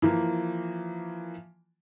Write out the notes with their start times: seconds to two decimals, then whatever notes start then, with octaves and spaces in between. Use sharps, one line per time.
0.02 E3 F3 A#3